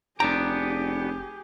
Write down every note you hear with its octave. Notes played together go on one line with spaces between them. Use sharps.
F1 B3 D4 G4 G#4 G5 A#5